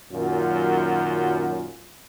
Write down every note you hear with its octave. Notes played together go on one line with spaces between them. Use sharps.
F#2 A#2 D#3 F#3 C#4 F4